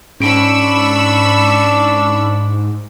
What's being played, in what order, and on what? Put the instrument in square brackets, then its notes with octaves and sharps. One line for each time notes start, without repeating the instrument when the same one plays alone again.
[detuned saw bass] G#2 [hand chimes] C#4 D7 [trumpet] D4 [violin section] B5 C#6 E6